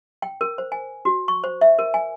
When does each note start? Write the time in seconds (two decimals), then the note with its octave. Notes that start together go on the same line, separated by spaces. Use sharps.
0.22 G5
0.41 A#4
0.58 C5
0.72 G#5
1.05 F#4
1.28 C#6
1.44 C5
1.61 E5
1.79 A#4
1.94 G#5